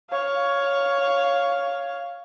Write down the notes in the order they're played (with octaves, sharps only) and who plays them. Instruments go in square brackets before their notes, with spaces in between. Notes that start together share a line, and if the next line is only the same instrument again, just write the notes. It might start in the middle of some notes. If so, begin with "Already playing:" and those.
[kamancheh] C#5 F5